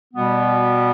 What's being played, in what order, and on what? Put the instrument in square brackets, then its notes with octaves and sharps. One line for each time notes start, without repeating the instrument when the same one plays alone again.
[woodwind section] B2 G3 B3